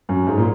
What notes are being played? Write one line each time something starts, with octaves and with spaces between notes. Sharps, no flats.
F#2
G#2
A#2